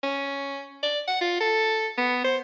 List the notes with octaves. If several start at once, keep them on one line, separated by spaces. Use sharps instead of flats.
C#4
D5
F#5
F4
A4
B3
C5